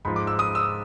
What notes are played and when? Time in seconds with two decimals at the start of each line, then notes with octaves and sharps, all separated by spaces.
0.05 G#2 F3 B5
0.16 D6
0.27 E6
0.39 D#6
0.55 E6